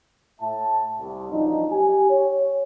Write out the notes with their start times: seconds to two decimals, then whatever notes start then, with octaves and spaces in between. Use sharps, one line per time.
0.41 A2 E5 A5
0.99 C2
1.31 A1 F#2 F3 D4 D#4
1.71 G4 G#5
2.10 C#5